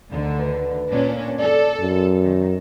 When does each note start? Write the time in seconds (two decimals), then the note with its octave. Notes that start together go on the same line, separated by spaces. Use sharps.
0.10 D2 D3 D#3
0.39 B4
0.90 A#2 C#4 D4
1.39 A4 D5
1.80 F#2
2.20 D#3